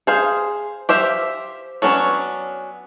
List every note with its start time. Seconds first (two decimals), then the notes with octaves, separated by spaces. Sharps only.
0.07 G#4 C5 F5
0.89 G4 C5 E5 F5
1.82 F#3 B3 C#4 D4